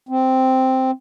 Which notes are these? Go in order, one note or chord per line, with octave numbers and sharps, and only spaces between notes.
C4